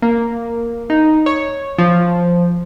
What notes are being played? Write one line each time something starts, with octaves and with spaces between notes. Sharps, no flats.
A#3
D#4
C#5
F3